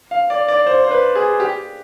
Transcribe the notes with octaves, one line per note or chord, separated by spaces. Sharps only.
F5
D5
D5
C5
C5
B4
G#4
G4